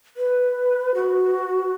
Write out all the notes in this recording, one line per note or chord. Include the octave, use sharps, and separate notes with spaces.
B4
F#4